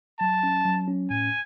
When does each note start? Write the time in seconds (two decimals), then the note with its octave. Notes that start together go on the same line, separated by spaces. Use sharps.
0.20 F#3 A5
0.43 C#4
0.65 F#3
0.88 C#4
1.10 A2 G#5